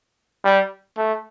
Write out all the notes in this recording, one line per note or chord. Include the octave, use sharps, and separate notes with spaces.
G3
A3